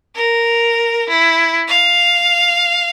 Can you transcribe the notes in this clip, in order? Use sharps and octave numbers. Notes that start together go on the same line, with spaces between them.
A#4
E4
F5